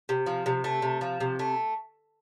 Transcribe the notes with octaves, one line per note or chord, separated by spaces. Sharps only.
C3
F3
C3
A3
C3
F3
C3
A3